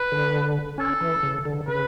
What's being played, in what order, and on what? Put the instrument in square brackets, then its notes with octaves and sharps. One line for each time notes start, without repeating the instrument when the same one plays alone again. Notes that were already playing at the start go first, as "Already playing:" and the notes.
Already playing: [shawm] B4
[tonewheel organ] D3
[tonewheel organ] C#4 [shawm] A4
[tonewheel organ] E3
C#3
D3
[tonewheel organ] C#3 [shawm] B4